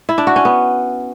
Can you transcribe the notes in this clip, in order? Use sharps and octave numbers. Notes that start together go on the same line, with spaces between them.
E4
D4
F#4
C#4
B3